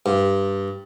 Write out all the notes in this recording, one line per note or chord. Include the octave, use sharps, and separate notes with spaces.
G2